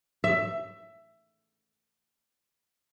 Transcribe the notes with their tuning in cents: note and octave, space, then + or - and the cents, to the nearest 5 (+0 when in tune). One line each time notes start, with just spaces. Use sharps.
E5 +15